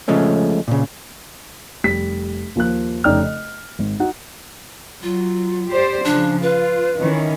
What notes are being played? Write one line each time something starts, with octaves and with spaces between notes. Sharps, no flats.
C#3 F3 G#3 A3 C#4
A#2 C#3
F1 G3 B6
D#2 F3 A#3 F#6
F1 C#3 D#4 D5 G5 F6
D#5
G#1
D#4 F#4 F#5
F#3 F4
G4 C5 D5
C#3 F3 D4
F4 B4
D#3 E3 C#4